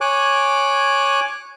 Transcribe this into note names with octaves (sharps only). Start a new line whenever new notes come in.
C#5 G#5 D6 F#6